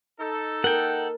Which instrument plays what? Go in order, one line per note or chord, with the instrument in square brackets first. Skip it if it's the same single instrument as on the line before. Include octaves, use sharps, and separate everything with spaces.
[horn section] D#4 A4
[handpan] A#4 [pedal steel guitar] F#5 G5